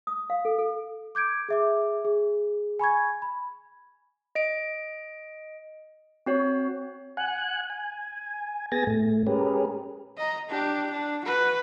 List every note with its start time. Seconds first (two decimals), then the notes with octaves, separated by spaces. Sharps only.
0.07 D#6
0.30 F5
0.45 A4
0.59 A4
1.15 D6 G6 G#6 D7
1.49 G#4 E5 D6
2.05 G#4
2.79 G#5 B5 C#6 G#6
3.22 B5
4.35 D#5 D7
6.26 C4 F#4 C#5
7.17 F#5 G#5 F#6
7.70 G#5
8.72 B3 G#4 G#5 A6 A#6
8.87 A2 A3
9.27 G#3 C#4 G4 G#4 A#4 B4
10.18 D#5 A#5
10.49 D4 G4
10.91 D4
11.25 F#4 B4